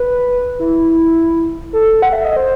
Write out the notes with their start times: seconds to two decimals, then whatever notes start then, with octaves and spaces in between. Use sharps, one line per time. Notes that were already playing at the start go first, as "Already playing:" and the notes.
Already playing: B4
0.60 E4
1.73 A4
2.02 F#5
2.13 E5
2.25 D#5
2.37 C5